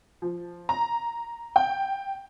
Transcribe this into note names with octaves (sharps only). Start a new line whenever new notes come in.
F3
A#5
G5